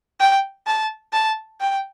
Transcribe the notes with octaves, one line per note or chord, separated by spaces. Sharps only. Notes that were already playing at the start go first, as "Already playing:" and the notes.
G5
A5
A5
G5